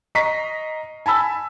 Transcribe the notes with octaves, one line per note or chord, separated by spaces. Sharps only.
D#5 A#5 C#6 B6 C7
G#5 A5 B5 E6